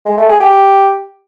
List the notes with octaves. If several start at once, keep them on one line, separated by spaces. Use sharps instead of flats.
G#3
A3
G#4
G4